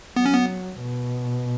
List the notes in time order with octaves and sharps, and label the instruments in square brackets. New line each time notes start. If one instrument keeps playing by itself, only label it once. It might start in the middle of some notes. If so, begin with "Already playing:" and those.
[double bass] F#3 [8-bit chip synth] B3
[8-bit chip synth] C#4
B3
[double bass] B2